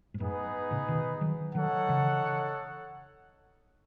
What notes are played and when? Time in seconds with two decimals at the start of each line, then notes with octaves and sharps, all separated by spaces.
0.14 G#2
0.20 F#2 A2 B3 D#4 G#4 B4
0.71 A2 C#3
0.88 B2 D#3
1.21 D#3 F#3
1.55 D#3 F#3 D#4 A4 C#5 F#5
1.88 C#3 E3